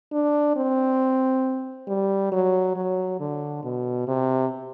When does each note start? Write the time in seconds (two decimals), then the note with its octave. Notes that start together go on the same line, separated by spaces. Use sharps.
0.12 D4
0.56 C4
1.88 G3
2.32 F#3
2.76 F#3
3.20 D3
3.64 B2
4.07 C3